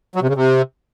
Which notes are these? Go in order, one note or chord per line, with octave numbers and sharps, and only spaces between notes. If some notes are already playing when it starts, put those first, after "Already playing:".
F#3
C3
C#3
C3